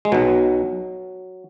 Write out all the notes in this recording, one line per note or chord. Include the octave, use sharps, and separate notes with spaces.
G#3
B1 B2 F#3